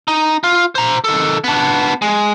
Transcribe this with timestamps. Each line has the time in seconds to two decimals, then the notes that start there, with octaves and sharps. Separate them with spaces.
0.08 D#4
0.44 F4
0.75 C5 A#5
1.04 D#3 A4
1.44 B3 D4
2.02 G#3